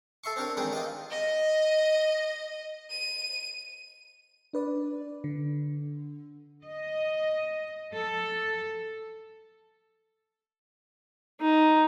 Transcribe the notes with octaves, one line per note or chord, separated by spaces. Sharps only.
A4 E5 C6 C#6
C4 D4 G4 A#4 C#5
E2 D#3 G#3 D#4 G#4 G5
F4 G4 D#5
D#5
D#7
D4 B4 D5
D3
D#5
A4
D#4